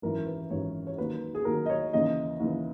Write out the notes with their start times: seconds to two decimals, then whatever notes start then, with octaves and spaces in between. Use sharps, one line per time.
0.02 G#1 F#2 E3 A#4
0.26 B4
0.50 G#1 F#2 E3 C#5
0.87 C#5
0.98 D#2 D#3 F#3 B4
1.35 G#4
1.45 D#2 D#3 F#3 A#4
1.66 D#5
1.69 C#5
1.93 D#2 C#3 E3 D#5
2.40 D#2 C#3 E3